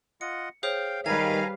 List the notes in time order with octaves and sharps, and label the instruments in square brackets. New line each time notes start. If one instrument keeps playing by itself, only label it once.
[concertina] F4 D#5 F#5 [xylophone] C#7
[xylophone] G#4 C5 C#5 [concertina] F5 G5
[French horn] D#3 [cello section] G3 B4 F5 [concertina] G#5 A#5 [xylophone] G#6